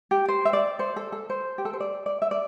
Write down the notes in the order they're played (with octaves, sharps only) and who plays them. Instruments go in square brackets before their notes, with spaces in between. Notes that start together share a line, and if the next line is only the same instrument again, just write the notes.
[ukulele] G4
C5
E5
D5
C5
A4
A4
C5
G4
A4
C5
D5
D5
E5
D5